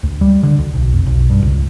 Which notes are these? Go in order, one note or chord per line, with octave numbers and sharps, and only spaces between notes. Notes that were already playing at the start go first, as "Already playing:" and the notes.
D2
G3
D3
D2
B1
F1
B1
G2
C#2